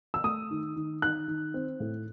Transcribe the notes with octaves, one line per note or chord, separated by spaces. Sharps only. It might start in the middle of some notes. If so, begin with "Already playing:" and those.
E6
A3 D#6
D#3
D#3
D#3 F#6
D#3
C4
A2